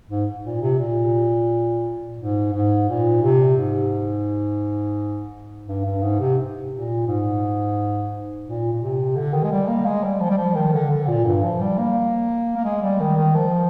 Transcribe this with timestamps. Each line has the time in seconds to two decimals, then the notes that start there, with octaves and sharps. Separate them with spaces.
0.09 G#2
0.44 A#2
0.62 C3
0.78 A#2
2.18 G#2
2.53 G#2
2.88 A#2
3.22 C3
3.57 G#2
5.67 G2
5.85 G2
6.02 G#2
6.20 C3
6.71 A#2
7.06 G#2
8.46 A#2
8.72 A#2
8.82 C3
9.16 D3
9.34 D#3
9.43 G#3
9.51 G3
9.68 A#3
9.85 G#3
10.03 G3
10.20 F3
10.30 G3
10.38 F3
10.55 D#3
10.73 D3
10.91 D3
11.07 A#2
11.25 G2
11.43 F3
11.60 G3
11.78 A#3
12.56 A#3
12.64 G#3
12.82 G3
13.00 D#3
13.17 D#3
13.35 F3